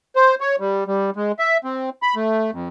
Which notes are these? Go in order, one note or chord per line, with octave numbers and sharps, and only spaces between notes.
C5
C#5
G3
G3
G#3
E5
C4
B5
A3
F2